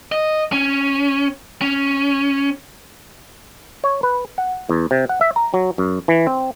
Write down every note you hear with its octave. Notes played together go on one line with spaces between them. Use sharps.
D#5
C#4
C#4
C#5
B4
F#5
E2
C3
F#5
E5
A#5
F#3
F#2
E3
C4